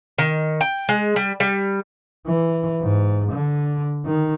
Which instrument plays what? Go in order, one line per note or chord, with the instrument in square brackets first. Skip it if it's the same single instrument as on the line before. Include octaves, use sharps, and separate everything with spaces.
[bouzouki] D#3
G5
G#3
G3
G3
[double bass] E3
G#2
D3
D#3